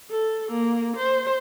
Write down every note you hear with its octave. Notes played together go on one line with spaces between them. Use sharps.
A4
A#3
C5